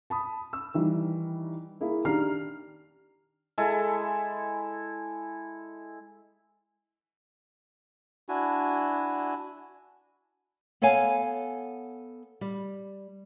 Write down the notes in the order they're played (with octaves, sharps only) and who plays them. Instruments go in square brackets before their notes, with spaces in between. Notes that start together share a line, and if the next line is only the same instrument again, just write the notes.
[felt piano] A5 B5 D#6
E6
D#3 E3 G3
A#3 E4 G#4
D#3 D4 G4 A#5 F6 C7
[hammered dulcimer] G#3 E4 A4 G#5
[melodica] D4 E4 F#4 G#5
[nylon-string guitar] B3 A4 C#5 F5 G#5
G3